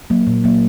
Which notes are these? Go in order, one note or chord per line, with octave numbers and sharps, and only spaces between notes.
F#3 A#3
A#2
F#3 A#3